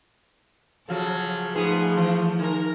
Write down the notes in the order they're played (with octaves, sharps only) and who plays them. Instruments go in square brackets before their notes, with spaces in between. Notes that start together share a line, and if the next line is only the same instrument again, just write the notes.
[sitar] C#3 F3 F#3 [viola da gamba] A4
[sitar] G#2 B3 G#4 [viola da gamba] F3 A3
[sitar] E3
D#3 A#4